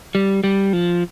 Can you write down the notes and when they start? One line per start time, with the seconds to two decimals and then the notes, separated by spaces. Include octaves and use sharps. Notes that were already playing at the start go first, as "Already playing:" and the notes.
0.15 G3
0.44 G3
0.73 F3